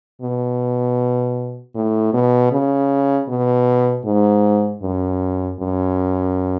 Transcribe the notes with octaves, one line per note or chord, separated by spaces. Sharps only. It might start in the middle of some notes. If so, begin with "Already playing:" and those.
B2
A2
B2
C#3
B2
G#2
F#2
F#2